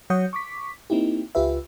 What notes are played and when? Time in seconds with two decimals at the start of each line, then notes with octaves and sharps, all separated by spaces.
0.10 F#3 C#5 F#5 D#6 G6
0.33 C#6 D6 B6
0.90 A#3 C4 D#4 E4 G4
1.35 C#2 F4 G4 B4 E5